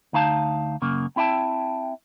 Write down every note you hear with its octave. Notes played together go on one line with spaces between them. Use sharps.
D2 D#4 F5 A5
F#2 C#3 A#3
C4 E4 E5 G5 A5